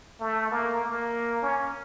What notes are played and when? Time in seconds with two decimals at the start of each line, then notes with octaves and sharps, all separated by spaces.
0.21 A3
0.51 A#3
0.81 A#3
1.42 C#4